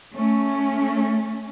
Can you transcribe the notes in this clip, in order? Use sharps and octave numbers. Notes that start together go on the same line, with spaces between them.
A3 C#4